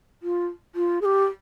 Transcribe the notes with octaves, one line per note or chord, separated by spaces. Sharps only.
F4
F4
G#4
G4